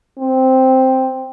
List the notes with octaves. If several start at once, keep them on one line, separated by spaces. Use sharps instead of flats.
C4